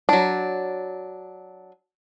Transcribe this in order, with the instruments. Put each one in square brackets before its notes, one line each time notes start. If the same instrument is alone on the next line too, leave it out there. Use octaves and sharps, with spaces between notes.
[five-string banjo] F#3 D4